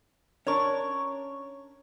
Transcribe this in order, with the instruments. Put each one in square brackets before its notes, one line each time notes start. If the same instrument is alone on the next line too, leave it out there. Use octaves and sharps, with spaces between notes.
[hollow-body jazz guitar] C#4 D4 A#4 [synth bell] C#5 C#6